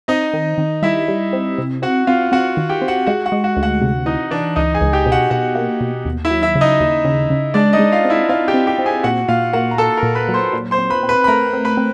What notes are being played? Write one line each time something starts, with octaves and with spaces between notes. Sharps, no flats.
C4 D#4 D#5
D#3
D#3
G3 E4 E5
G3
C4
C3
C4 F#4 F#5
C4 F4 F5
C4 F#4 F#5
D#3
G4 G5
C4
F#4 F#5
G#3 F#4 F#5
F#4 F#5
G#3
F#4 F#5
D2
F#4 F#5
C3
E3 D#4 D#5
E3 D4 D5
C#2 D#4 D#5
G#4 G#5
C#2
G4 G5
B2
F#4 F#5
B2 F#4 F#5
A#3
B2
D#2
E4 E5
F#3
E4 E5
C#3
D#4 D#5
D#2
C#3
C#3
G#3 D4 D5
D#4 D#5
G#3
F4 F5
C4
E4 E5
C4 F4 F5
G4 G5
C4
G4 G5
C4
G#4 G#5
A#2 F#4 F#5
A#2 F4 F5
A#3 F#4 F#5
A#5
A#3 A4 A5
A#4 A#5
A#2
B4 B5
F#3
C5 C6
A#2
C5 C6
C4
B4 B5
C4
B4 B5
B5
A3 A#4 A#5
C4
B4 B5
C4